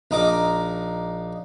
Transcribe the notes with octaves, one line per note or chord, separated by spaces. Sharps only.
A#1 D#4 D6